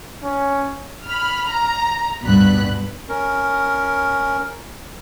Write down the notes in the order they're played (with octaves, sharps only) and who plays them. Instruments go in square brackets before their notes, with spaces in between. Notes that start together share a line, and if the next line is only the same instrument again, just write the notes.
[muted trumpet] C#4
[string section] B5 F6
A#5
D2 G2 B2 B5 F#6
[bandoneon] C#4 A#4